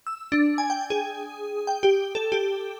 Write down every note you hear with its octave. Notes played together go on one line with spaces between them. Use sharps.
E6
D4
G#5
G5
G#4
G5
G4
A4
G4